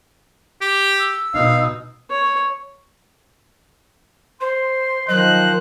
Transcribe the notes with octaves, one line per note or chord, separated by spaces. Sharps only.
G4
E6
B2 D#4 F5
C#5
C5 C6
D#3 F3 F#3 C5 D#5 F#6